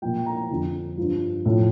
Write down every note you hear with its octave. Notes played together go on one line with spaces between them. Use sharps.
A#2 F3 G5
A#5
F2 D3 F3
G2 F3
A2 F3